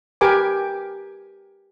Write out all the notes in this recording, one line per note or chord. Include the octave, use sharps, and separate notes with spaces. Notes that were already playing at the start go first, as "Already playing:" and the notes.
G4 A#4 B4 G#5 D6